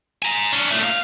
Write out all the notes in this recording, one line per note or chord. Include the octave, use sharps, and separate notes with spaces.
G#5 A#5
C#4 D4
A#2 A3
F5